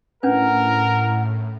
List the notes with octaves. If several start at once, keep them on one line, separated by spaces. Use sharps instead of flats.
A2 C#4 D4 A#4 B4 F#5